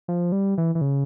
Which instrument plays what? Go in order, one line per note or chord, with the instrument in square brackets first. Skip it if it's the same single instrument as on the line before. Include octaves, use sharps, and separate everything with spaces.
[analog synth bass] F3
G3
E3
E3
C#3